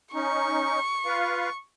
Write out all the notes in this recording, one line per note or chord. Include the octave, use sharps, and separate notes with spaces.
C#4 D#4 C#6
F4 B4 F5